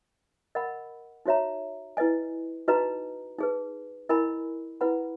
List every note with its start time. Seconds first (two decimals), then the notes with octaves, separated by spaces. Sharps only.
0.55 A#4 D#5 F#5 B5
1.26 D#4 F#4 C#5 E5 A#5
1.97 E4 B4 D#5 G#5
2.68 D#4 F#4 B4 D#5 A#5
3.39 D#4 G#4 B4
4.09 E4 A#4 D#5 G#5 B5
4.81 E4 B4 F#5 B5